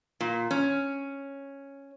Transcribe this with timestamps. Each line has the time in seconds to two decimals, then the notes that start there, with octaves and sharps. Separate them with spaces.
0.21 A#2
0.51 C#4